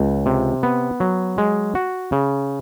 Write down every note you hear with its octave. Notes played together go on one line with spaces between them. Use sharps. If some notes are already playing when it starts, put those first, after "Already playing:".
Already playing: C#2
C3
B3
F#3
G#3
F#4
C#3